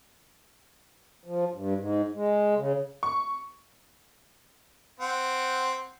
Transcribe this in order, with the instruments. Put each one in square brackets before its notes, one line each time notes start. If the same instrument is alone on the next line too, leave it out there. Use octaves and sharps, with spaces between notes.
[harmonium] F3
G2
G#2
G#3
C#3
[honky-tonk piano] C#6
[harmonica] C4 F#5